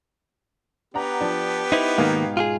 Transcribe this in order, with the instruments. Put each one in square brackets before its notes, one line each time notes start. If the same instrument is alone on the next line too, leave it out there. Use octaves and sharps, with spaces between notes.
[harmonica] B3 G4 [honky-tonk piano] D4 F#5 A#5
[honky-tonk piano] F3 D4
[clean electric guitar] D#4 E4 [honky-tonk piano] C5 F7
[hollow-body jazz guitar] G#2 B2 D#4 [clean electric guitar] D#3 A#3 [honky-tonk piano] F5 G5 G#6
[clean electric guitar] F4 F#4 G#4